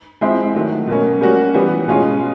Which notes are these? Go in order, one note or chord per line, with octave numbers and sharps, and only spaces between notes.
F3 G#3 C4 E4
D#3 F#3 A3
B2 F#3 A#3 C#4
G3 A#3 C#4 F#4
E3 G3 B3
B2 G#3 C#4 F4 G#4